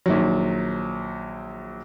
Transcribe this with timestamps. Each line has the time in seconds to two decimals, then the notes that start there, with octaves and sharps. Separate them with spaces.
0.06 A#1 D#3 F#3